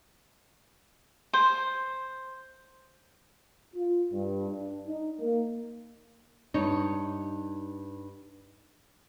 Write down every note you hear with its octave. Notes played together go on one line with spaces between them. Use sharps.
C5
F4
G2
D4
D#4
A#3
G2 D#4 C#5